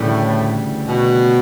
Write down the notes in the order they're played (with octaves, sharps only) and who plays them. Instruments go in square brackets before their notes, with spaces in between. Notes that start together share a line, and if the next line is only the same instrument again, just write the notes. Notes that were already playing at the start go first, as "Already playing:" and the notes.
Already playing: [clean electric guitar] D2 C#3 E3 G3 [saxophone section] A2
[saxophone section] B2